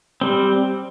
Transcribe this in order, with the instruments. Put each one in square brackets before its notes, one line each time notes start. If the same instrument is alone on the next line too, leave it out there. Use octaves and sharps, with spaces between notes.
[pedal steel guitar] G3 C4